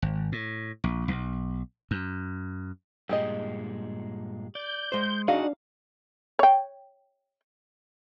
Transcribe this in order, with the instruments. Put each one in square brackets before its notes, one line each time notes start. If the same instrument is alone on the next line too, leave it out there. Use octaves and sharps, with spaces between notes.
[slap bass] G#1
A2
A#1
B1
F#2
[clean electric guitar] G2 A#2 G#3 [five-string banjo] G4 G#4 D#5
[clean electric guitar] D5 [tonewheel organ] G6
[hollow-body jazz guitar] G#3 C5
[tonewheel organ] D4 [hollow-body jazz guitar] D#4 F#4 G#4 [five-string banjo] F5 [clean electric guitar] F#5
[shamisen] C#5 G5